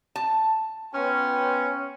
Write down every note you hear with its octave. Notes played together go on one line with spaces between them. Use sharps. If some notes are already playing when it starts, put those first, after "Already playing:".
A5
B3 C#4 F4 B4 G5